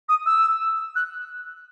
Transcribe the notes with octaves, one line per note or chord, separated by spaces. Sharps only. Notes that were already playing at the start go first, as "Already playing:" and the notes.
D#6
E6
F#6